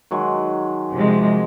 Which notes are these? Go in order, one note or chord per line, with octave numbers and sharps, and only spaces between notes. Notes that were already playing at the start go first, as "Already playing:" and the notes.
D#3 F#3 G#3
C3 F3 G#3